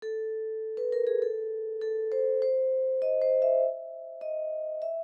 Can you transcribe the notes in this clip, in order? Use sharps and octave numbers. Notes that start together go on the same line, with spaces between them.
A4
B4
A#4
G#4
A4
A4
C5
C5
D#5
C5
E5
D#5
E5